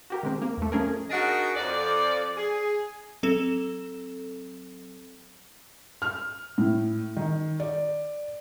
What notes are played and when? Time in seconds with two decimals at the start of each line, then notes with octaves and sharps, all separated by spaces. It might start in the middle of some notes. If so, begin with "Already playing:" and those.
0.10 F#4 G4 A#4
0.23 D#3 G#3 C4
0.42 A#3
0.57 E2 A3
0.72 F3 A3 C#4 G#4 A#4
1.10 D4 D#4 F#4 G#4 A#4 D#5
1.56 F2 D5
2.37 G#4
3.23 F#3 C4 A4 E7
6.02 F6
6.58 A2
7.17 D#3
7.60 D5